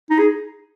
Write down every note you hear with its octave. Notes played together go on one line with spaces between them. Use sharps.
D#4
G#4